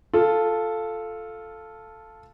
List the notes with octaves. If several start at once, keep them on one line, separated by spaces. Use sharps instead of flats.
F4 A4